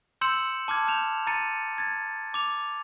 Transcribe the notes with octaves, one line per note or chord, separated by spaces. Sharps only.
C6 E6 G6 C#7 E7 F#7
A5 D6 F6 G#6
G6 E7 F7
A#5 A6 C#7 D#7
G#6 A6
D6 F7